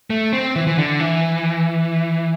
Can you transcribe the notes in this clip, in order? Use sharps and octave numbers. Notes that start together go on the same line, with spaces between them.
A3
C4
E3
E3
D3
E3